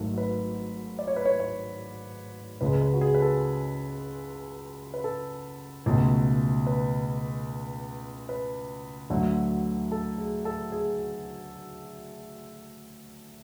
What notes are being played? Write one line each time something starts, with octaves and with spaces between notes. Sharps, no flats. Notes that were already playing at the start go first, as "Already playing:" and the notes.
Already playing: G#1 G#2 F#3 A3
B4
D5
C#5
B4
C#5
C#5
C#2 C#3 G#3 B4
B4
F#4
G#4
B4
A4
B4
A4
C#2 B2 A3
B4
B4
D2 D3 F#3 A3
A4
G#4
A4
G#4